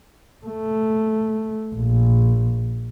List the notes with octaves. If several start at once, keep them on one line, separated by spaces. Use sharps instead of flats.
A3
A#1